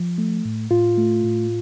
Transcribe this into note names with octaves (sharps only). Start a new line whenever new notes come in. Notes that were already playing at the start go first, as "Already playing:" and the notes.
Already playing: F3
A3
A2
A2 F4
A3
A2